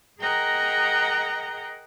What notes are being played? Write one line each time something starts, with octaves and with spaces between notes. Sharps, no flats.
G#4 A#4 D#5 F#5 G5 A#5